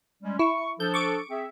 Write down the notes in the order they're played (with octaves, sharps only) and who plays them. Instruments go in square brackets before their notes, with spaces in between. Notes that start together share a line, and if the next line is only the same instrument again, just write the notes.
[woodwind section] G3 G#3 C#4
[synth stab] E4 [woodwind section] C#6
[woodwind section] F3 D4 A4 [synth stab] G6
[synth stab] C#6 D6 D7
[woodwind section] C4 G#4 E5